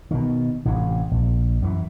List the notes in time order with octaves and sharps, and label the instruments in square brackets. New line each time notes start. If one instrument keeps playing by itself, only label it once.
[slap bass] B2 D#3
A1 A2 C3
A#1
F#2 E3